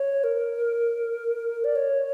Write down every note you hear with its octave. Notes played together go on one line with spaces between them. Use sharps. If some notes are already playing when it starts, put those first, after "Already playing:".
Already playing: C#5
A#4
D5
C#5